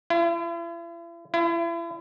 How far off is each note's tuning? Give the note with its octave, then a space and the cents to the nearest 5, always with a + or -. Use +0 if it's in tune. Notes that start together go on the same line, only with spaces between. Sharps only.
E4 +45
E4 +40